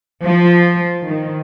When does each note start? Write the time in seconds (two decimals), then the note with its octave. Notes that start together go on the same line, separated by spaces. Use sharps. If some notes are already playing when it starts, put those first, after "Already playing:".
0.25 F3
1.06 D#3